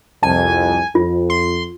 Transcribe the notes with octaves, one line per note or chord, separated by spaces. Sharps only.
C2 F2 G#5 A5
F2 F4
C6